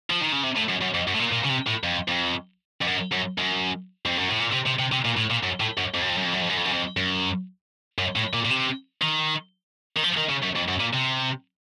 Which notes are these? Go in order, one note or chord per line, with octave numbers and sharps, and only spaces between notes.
F3
D#3
C#3
C3
A2
F#2
F#2
F2
F#2
A2
A#2
A#2
C#3
C3
A2
F2
F2
F2
F#2
F#2
F#2
F2
F#2
A2
A#2
C3
C3
C3
C3
A#2
A2
A#2
F#2
A2
F#2
F2
F#2
F2
F#2
F2
F#2
F2
F#2
F2
F#2
F2
F#2
F#2
A2
A#2
A#2
C3
D#3
D#3
F3
D#3
C#3
F#2
F2
F#2
A#2
C3